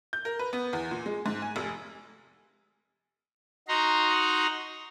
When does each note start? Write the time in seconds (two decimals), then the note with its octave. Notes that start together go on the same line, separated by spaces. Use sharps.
0.13 G6
0.25 A#4
0.39 B4
0.53 B3
0.73 E2
0.91 A#2
1.06 G#3
1.26 G#2
1.42 G#5
1.56 F1
3.68 D#4 F#4 A#5 C6